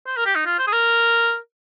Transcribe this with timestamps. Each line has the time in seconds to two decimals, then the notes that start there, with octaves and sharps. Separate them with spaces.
0.07 C5
0.17 A#4
0.26 G4
0.35 D#4
0.46 F4
0.59 C5
0.67 G#4
0.73 A#4